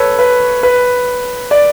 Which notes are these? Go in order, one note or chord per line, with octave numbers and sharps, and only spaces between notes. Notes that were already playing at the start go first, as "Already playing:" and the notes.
Already playing: A4 B4 C#5
B4
B4
D5